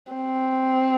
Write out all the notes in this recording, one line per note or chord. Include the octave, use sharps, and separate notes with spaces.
C4